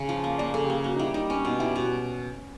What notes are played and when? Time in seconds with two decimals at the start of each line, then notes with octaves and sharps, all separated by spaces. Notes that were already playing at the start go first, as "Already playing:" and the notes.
Already playing: C#3
0.09 F3
0.24 A#3
0.38 A#3 D5
0.54 C#3 A4
0.64 G4
0.70 A#3 G#4
0.84 A#3 F#4
0.95 D#4
0.99 G3 E4
1.14 G3 D#4
1.30 C#4 D4
1.45 B2 D#4
1.60 G3 E4
1.75 B2 F#4